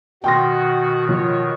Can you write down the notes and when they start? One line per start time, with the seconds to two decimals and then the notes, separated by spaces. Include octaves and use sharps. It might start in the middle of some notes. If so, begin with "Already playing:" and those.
0.24 B2 D#3 F#4 G5 C6 A#6
1.09 F3 C#5